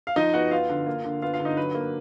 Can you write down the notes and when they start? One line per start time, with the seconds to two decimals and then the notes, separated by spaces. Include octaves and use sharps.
0.07 F5
0.16 F3 D#4 D#5
0.34 B3 F#4 F#5
0.51 B3 F4 F5
0.69 D3
0.86 A#3
1.04 D3
1.22 B3 F4 F5
1.34 F4 F5
1.40 D3
1.45 D#4 D#5
1.57 F#3 B4
1.75 A#3